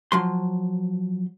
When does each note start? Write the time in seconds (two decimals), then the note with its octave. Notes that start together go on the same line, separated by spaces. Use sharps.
0.12 F3 F#3 C6